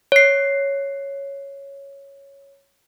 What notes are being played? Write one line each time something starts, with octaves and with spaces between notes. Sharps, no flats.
C#5 C7